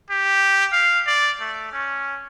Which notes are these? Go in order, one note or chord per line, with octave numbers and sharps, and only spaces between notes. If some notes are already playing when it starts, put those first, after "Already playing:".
G4
F5
D5
A3
C#4